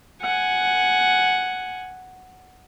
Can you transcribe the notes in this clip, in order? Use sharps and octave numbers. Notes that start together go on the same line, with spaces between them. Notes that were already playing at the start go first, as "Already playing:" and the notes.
F#5 G#5